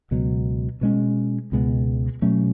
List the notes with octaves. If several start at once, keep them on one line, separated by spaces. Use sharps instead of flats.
C#2 B2 F#3
B2 G#3 C#4
C#2 B2 G#3 B3
B2 F#3 A3 C#4